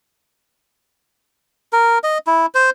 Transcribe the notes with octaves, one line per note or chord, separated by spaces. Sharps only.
A#4
D#5
E4
C5